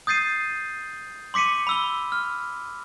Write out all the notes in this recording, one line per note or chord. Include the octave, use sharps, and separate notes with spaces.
D#6 G6 A6 C7 D#7
C6 D6 B6 C#7 D#7
B5 E6 G7
F6